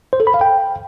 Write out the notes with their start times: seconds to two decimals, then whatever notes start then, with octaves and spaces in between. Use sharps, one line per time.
0.13 C5
0.20 A4
0.27 B5
0.34 F5
0.41 G5